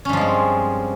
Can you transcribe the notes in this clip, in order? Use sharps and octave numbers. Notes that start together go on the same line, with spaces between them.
G2 F3 G#3 C4 C#4